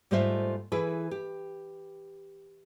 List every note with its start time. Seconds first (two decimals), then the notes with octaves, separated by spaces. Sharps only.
0.11 G#2 G3 A3 F4 C5 E5
0.72 E3 E4 G#4 B4
1.11 G4